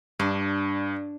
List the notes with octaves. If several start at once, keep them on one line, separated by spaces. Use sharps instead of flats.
G2 D4